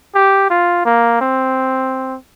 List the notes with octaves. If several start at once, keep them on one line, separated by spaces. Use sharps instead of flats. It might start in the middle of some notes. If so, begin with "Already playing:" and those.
G4
F4
A#3
C4